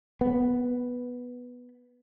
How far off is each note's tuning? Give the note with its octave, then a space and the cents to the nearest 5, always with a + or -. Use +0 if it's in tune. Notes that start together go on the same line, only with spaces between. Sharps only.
B3 -5